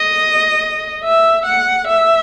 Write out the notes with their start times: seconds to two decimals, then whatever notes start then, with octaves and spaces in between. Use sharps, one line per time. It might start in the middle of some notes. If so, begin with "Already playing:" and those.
Already playing: D#5
1.03 E5
1.46 F#5
1.88 E5